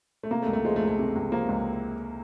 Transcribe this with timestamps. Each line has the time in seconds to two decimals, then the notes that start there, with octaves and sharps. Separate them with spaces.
0.23 A3
0.31 C3 A#3
0.42 A3
0.47 C#2
0.53 A3
0.64 F3 G#3
0.76 A3
0.82 C#2
0.88 A3
0.99 C3
1.16 C#2
1.32 F3 A#3
1.49 C#2